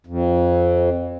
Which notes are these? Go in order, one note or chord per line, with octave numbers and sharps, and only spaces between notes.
F2